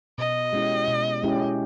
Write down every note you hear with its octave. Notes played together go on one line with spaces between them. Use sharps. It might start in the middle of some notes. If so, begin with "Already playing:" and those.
B2 D#5
G#3 C#4 E4 G4
B2
G#3 C#4 E4 G4